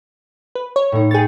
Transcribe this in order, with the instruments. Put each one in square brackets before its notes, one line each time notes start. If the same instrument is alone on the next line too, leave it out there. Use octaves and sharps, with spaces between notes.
[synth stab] B4
C#5
[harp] A2 D#4
[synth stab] G#4 A6 [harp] C#5 G5